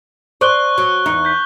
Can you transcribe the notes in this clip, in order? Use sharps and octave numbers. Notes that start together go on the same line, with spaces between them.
C5 D5 C#6 F#6 G7
F#3
E2 D#4
G6 B6